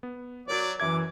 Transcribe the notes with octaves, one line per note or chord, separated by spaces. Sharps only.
B3
F#3 F#4 A#4 C#5 D5
F#2 E3 E5 D6 G#6